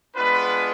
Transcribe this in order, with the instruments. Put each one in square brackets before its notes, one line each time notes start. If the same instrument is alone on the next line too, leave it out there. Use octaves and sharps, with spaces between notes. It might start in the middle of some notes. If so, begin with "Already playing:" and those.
[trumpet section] G#3 B3 D4 F4 B4